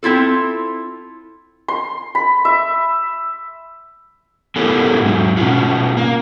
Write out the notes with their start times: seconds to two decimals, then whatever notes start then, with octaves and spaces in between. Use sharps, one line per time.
0.03 C4 E4 F4 A4
1.68 C6
2.15 B5
2.45 E5
4.56 B3 E4 G4 A4 A#4 C#5
5.01 G#2 F#3
5.37 B2 C#4 F4 F#4
5.97 A#3